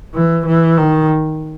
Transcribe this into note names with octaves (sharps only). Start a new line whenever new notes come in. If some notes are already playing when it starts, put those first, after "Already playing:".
E3
E3
D#3